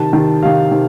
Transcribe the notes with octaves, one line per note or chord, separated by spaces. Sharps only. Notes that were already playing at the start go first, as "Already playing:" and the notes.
Already playing: C3 D#3 A5
C3 D#3
C3 D#3 F5
C3 D#3